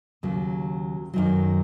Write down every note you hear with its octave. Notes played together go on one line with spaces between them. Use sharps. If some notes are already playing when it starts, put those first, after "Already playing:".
D#2 C#3 F#3
F#2 D#3 F#3